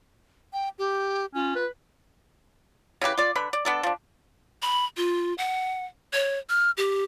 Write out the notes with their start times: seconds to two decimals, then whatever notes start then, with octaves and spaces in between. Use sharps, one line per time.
0.53 G5
0.78 G4
1.35 C#4 F4
1.56 B4
3.01 C#3 E4 G4 B4
3.17 F4 D5
3.36 D3 B4 B5
3.53 D5
3.65 B3 D4 A4
3.83 F3 D4
4.62 B5
4.97 F4
5.38 F#5
6.13 C#5
6.50 F6
6.77 G4